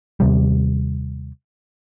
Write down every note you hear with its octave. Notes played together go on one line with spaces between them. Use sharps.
D#2 C3 G3